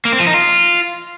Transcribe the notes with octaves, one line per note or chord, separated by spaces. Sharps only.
A#3
C4
F3
D#4
F4